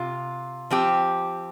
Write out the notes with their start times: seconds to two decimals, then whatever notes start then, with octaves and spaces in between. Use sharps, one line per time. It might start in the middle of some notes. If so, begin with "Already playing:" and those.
Already playing: C3 F4
0.70 F3 C4 G4